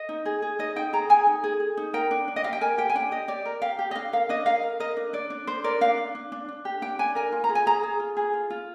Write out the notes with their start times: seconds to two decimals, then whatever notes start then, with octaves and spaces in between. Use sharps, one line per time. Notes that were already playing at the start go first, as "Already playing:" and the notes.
Already playing: D#5
0.09 D#4
0.26 G#4
0.42 G#4
0.59 D#4 D#5
0.76 D#4 G5
0.93 G#4 A#5
1.09 G#4 G#5
1.27 D#4
1.44 G#4
1.60 G#4
1.77 D#4
1.94 A#4 G5
2.11 D4
2.28 D4
2.36 D#5
2.44 G4 F5
2.53 G5
2.61 A#4 G#5
2.78 G4 G5
2.90 G#5
2.95 D4 G5
3.11 G4 D#5
3.28 G4 D5
3.46 A#4
3.62 G4 F5
3.79 G4
3.91 D#5
3.95 D4 F5
4.13 A#4 F5
4.29 D4 D#5
4.46 A#4 F5
4.63 A#4
4.80 A#4 D#5
4.97 D4
5.13 D4 D5
5.30 D4
5.47 D4 C5
5.64 A#4 D5
5.81 D4 F5
5.98 D4
6.15 D4
6.32 D4
6.49 D4
6.65 G4
6.82 D4 G5
6.99 D4 G#5
7.15 A#4 G#5
7.32 F4
7.44 A#5
7.49 G#4
7.55 G#5
7.66 G#4 A#5
7.83 G#4
8.00 F4
8.17 G#4
8.33 F4
8.50 F4